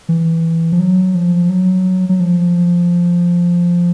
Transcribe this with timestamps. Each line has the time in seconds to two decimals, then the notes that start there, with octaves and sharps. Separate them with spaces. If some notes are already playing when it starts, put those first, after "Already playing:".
0.09 E3
0.72 F3
0.79 F#3
1.15 F3
1.49 F#3
2.09 F#3
2.20 F3